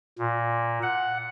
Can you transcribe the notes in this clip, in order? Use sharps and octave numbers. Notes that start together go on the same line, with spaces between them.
A#2
F#5